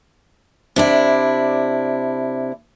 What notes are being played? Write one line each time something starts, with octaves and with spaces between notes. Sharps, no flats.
C3 D4 E4